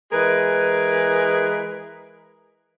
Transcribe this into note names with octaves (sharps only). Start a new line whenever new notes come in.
E3 G#3 G#4 A#4 B4